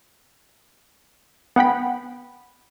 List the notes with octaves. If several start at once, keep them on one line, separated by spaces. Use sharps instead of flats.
B3 F#5 G5 B5